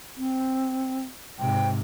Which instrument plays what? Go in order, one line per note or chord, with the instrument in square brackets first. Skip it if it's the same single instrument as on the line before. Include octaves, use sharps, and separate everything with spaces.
[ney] C4
[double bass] G#2 C3 [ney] G5